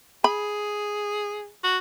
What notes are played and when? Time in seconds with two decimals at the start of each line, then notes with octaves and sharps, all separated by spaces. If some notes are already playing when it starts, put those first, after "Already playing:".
0.24 G#4 B5
1.64 F#4